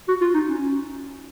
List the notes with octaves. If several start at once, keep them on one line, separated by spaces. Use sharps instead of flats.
F#4
F4
D#4
C#4